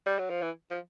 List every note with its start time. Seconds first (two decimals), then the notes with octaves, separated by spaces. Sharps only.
0.06 G3
0.19 F#3
0.30 F3
0.42 E3
0.70 F3